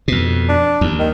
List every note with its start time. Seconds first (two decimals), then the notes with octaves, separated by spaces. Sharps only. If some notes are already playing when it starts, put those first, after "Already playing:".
0.08 F2 B2
0.48 D4
0.81 D#2
0.99 D#3